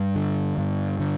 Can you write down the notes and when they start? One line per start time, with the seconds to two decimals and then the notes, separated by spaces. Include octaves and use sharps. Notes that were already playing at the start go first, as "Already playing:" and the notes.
Already playing: G2 G3
0.16 D3
0.58 G2
0.99 D3